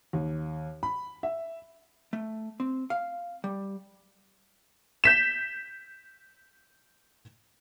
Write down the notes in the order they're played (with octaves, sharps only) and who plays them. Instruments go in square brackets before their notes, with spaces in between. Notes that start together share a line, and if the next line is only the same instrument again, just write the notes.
[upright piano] D#2
B5
E5
[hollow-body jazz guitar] A3
C4
F5
G3
[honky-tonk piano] G6 B6 E7